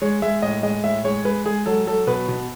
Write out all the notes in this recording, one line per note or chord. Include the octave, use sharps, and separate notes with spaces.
G#3 C#5
G#3 E5
A2 D#5
G#3 D#5
A2 E5
G#3 C#5
G#3 B4
G#3 G#4
F#3 A4
F#3 A4
B2 B4
B2